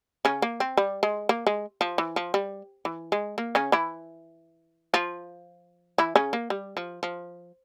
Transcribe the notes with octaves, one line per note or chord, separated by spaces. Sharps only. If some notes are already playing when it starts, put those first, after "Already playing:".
C#3 C#4
A#3
C4
G3
G#3
A#3
G#3
F3
E3
F3
G3
E3
G#3
A#3
C#3 C#4
E3 E4
F3 F4
E3 E4
C#3 C#4
A#3
G3
F3
F3